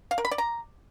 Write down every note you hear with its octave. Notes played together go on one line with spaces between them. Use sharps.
F5
A#4
B5
D5
A#5